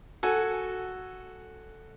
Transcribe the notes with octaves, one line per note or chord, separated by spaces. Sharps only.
F#4 A4 G#5